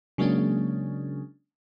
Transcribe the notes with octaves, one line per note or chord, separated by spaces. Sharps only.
C#3 F#3 G#3 A#3 C#4 D4